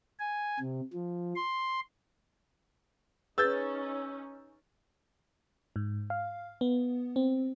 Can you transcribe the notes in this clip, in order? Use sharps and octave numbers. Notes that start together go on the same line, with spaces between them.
G#5
C3
F3
C6
C#4 D#4 G#4 B4 E6 G6 A6
G#2
F5
B3
C4